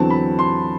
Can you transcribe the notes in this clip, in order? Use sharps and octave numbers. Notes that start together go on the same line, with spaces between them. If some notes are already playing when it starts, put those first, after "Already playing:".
Already playing: E2 D3 F#3 C4 A5
B5
C6